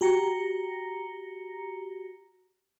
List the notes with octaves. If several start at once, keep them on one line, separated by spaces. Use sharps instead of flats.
F#4 G4 A#5 A#6 C#7